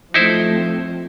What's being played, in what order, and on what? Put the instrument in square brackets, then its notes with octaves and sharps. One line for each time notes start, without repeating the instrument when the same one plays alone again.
[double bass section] F3 A3 C4 [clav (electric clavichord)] D#4 E4 C5